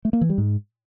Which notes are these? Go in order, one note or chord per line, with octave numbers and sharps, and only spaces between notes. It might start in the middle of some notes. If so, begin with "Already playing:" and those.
A3
A#3
E3
G3
G#2